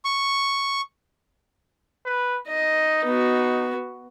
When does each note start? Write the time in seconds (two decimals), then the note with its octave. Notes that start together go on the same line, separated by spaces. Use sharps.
0.05 C#6
2.06 B4
2.48 D#4 D#5
3.05 B3 F#4